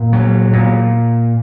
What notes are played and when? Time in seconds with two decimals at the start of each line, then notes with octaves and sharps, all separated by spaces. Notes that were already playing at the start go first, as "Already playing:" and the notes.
Already playing: A#2
0.13 F#3
0.53 A#2